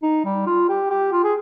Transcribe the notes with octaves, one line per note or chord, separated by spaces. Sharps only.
D#4
G3
F4
G4
G4
F4
G#4